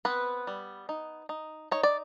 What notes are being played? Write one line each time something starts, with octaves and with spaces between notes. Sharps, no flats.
B3 C4 B4
G3
D#4
D#4
D#4 C#5
D5